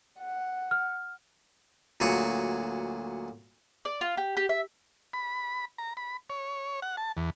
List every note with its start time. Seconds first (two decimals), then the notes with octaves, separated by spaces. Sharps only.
0.19 F#5
0.71 F6
2.00 D2 A#2 F#3 G#4 G#5 C#6
3.85 D5
4.01 F4
4.17 G4
4.37 G4
4.49 E5
5.13 B5
5.78 A#5
5.97 B5
6.30 C#5
6.82 F#5
6.97 A5
7.17 E2